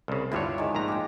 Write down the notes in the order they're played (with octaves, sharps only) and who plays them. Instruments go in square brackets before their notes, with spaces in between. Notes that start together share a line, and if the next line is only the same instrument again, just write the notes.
[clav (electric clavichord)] C2 C#3
[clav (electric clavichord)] D2 G2 C#5 [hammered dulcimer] E4 F4 D5
[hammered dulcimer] D#3 G#3
[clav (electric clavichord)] A#1 G#2 A#5
[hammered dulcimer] G4 G5